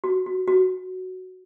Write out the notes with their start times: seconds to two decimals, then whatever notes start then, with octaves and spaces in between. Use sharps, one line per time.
0.04 F#4
0.26 F#4
0.48 F#4